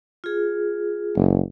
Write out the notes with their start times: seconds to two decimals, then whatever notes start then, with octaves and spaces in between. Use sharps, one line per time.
0.24 F4 G#4
1.16 F#1